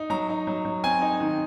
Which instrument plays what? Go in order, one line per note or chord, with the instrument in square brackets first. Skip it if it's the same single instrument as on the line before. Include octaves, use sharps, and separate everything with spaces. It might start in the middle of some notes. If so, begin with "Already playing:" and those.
Already playing: [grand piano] D#4
F#3 A#5
D#4
F#3
F#3
C4 G#5
D#4
D#3